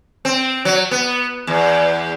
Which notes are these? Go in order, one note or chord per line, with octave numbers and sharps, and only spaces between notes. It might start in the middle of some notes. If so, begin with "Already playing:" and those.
C4
F#3
B3
E2